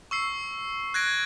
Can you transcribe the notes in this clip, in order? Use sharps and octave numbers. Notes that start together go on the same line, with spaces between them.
C#6 E6 C7
F#6 G#6 A#6 D7